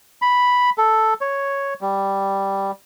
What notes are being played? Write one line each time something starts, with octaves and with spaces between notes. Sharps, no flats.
B5
A4
C#5
G3